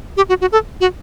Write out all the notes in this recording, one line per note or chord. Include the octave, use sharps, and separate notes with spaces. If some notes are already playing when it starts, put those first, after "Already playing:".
G4
F#4
F#4
A4
F#4